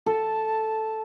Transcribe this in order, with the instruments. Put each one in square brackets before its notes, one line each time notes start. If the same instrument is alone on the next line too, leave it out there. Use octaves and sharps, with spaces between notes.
[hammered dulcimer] A4 [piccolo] A5